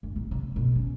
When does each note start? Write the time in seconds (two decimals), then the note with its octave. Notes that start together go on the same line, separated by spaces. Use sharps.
0.03 D2
0.16 D#1
0.31 C3
0.56 B2
0.75 C#4